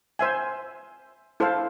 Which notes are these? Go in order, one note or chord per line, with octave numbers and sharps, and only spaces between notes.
C5 E5 G#5
E4 A4 C5 F5